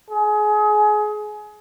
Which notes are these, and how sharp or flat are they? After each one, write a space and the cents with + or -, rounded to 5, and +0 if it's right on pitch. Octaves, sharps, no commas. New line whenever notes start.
G#4 +25